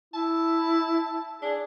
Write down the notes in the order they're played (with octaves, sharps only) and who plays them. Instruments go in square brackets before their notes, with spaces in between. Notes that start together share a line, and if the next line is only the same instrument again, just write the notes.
[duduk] E4 [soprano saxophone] A5
[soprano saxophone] D4 [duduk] G#4